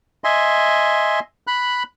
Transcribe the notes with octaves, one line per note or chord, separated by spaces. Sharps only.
D#5 E5 G#5 C6
B5 F#6